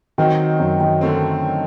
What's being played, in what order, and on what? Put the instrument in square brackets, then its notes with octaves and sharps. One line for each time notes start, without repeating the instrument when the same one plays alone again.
[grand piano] D#3 [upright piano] F#3 C4 D#4 F#4
[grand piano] F#2
D#3
[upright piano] D3 A3 C4